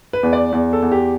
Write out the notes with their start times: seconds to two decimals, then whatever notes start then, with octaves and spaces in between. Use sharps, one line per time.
0.13 B4
0.23 E2
0.33 D5
0.52 E2
0.73 A4
0.82 E2
0.92 G4